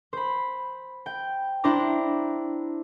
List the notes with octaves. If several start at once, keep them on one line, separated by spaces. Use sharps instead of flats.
C5 B5
G5
D4 E4 C5 A#5 D6